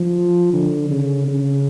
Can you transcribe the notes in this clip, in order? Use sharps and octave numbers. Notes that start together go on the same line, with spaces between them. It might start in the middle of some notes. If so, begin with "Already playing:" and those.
Already playing: F3
D3
C#3
C#3